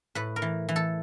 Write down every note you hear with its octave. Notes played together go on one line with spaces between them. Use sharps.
A2 B4
A#4
E3
E3
A4